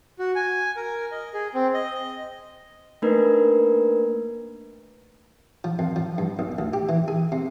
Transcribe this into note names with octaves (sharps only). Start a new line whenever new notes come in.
F#4
G#5
A#4
D#5
G#4
C4
D#5
A3 A#3 D4 D#4 A#4 B4
F3
F2
F3
G2
B1
D2
G4
E3
G#4
C3